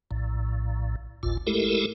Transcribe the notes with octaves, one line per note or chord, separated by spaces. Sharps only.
A#1 A2
G#1 D2 A2 F4
G#3 A3 E4 G4 A4 A#4